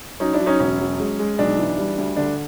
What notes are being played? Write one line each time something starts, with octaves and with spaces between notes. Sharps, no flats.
F#3 C#4 D#4
D4 E4
F#3
C#4 D#4
E1 C#4
F#3
G#3
G#3
B1 D4
E3
G3
D2
D3 D4